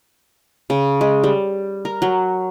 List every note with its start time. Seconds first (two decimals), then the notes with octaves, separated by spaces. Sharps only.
0.70 C#3
1.01 G#3
1.24 G3
1.85 A#4
2.02 F#3